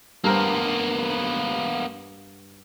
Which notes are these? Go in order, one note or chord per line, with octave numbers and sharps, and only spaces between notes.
G2 A#3 B3 A#4 C5